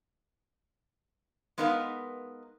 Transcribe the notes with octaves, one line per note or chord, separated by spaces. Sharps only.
G#3 B3 D#4 A#4 B4 F5